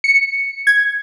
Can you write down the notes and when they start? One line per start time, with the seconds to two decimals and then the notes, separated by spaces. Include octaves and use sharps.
0.04 C#7
0.67 G#6